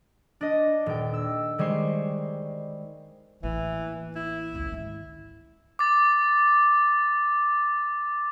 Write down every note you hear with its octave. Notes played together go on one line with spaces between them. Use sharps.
D4 D#5
D#1 G5
E6
D#3 G3 G#3 C5 C#6 C7
A1 E3 A#3
E4
C#2
G#2 D#3
D6 A6